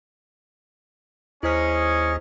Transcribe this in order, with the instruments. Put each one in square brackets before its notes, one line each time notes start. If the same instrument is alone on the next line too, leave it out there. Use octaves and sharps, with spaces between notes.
[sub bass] D#2 [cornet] C#4 [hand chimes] E4 C5 F6 [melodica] G#4 D#5